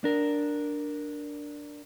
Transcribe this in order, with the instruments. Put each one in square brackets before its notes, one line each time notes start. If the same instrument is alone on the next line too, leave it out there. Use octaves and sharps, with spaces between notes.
[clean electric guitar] D4 A#4